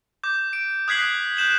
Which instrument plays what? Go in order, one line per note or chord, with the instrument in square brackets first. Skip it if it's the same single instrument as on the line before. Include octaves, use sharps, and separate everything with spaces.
[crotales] D6 G6
D7
D#6 F#6 G#6 B6 C7 F#7
F#6 G6 E7 F#7